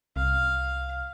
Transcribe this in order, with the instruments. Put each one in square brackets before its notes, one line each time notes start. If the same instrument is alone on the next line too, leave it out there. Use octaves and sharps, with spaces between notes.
[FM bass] C2 [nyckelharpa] F5